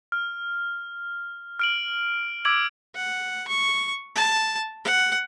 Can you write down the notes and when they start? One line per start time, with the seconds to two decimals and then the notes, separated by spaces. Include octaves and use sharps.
0.12 F6
1.59 F6 D7 F#7
2.45 D6 E6 G#6 D7 F#7
2.96 F#5
3.48 C#6
4.15 A5
4.84 F#5